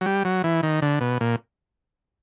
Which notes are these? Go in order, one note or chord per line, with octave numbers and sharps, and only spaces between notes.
F#3
G3
F#3
E3
D#3
D3
B2
A#2